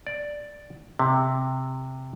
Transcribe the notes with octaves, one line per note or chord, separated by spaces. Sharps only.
D5
C3